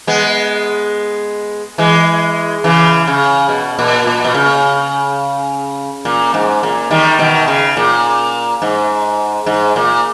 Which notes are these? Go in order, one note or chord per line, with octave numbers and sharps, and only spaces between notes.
G#3 B3
E3 G#3
C#3 E3
C#3
B2
A#2
A#2
B2
C#3
A#2
G#2
A#2
D#3 G3
B2 D#3
C#3
A#2
G#2
G#2
A#2